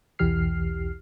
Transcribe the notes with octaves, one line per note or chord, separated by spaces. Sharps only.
B1 E2 E3 G4 F6 C7